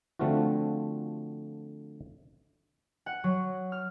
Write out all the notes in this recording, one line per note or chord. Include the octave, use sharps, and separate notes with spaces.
D3 F3 A3 C4 F4 F#4
F#5
F#3
F6